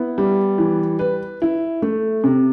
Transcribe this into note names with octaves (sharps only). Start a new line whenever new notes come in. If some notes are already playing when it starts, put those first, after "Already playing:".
Already playing: B3 E4
G3
E3
B4
E4
A3
C3